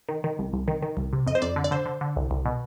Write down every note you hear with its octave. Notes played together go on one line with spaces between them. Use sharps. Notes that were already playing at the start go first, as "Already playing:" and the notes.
D#3
D#3
C2
C2
D#3
D#3
C2
C3
F2 D#5
C5
F2 D5
D3
D5
D3 C5
D3
D3
C2
C2
B2